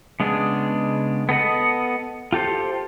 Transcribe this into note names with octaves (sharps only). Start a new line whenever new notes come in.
C#3 G#3 B3 D4 G#4
B3 A4 D#5 F#5
F4 G4 A4 C5